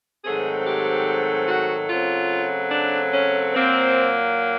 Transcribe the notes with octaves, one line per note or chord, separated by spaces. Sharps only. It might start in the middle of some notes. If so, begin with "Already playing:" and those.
G#2 D#3 F#3 A3 C4 G#4
G4
F#4
C#3 F#3 A3 C4 F4
D4
C#4
A#2 F#3 A#3 C4